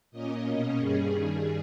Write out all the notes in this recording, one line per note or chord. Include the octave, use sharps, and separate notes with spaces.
A#2 A#3 C#4 D#5
B2 A#3 C#4
G2 G3 C#4 G#4
G2 D#3 G3